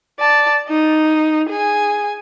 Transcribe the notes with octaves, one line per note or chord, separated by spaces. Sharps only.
D5 A5
D#4
G#4 G#5